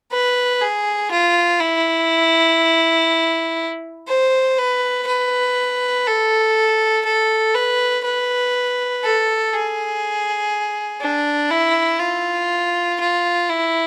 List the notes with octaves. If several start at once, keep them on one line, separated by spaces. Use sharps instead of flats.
B4
G#4
F4
E4
C5
B4
B4
A4
A4
B4
B4
A4
G#4
D4
E4
F4
F4
E4